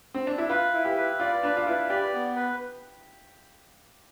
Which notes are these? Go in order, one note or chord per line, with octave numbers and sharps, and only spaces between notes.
C4
D4
E4
F4 B4
E4
G4
B4
F4 D5
D4 B4
F4
E4 B4
G4 D5
B3
B4